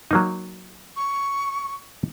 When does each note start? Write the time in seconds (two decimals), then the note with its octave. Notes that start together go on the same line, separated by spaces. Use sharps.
0.11 F#3 A#3 D#4
0.96 C#6